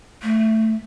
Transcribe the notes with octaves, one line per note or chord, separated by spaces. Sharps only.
A3